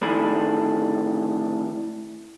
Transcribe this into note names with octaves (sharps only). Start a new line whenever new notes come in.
A2 D3 D#3 D4 G#4 B5